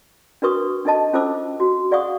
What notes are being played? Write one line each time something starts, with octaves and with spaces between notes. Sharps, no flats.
D4 F#4 A#4 B4 C#6 D#6
D4 D#4 A4 D#5 A5
C#4 F4 A4 C5 D6 E6
F#4
G#4 D5 F5 F#5 C#6 D#6